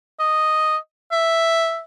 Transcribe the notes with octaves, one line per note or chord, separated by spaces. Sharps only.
D#5
E5